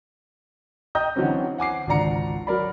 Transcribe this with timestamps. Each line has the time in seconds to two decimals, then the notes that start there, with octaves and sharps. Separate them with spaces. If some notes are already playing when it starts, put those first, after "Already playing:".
0.95 D#5 G5 A#5 D#6 G6
1.16 D3 E3 F#3 C4 C#4
1.58 F#5 G#5 D6 C7
1.87 G#1 C#2 D3 D5 A#5 C#7
2.47 F#3 A#4 D5 B5